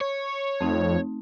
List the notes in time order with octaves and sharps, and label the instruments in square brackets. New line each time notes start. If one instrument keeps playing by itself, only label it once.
[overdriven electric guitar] C#5
[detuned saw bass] F2 [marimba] A3 C4 D#4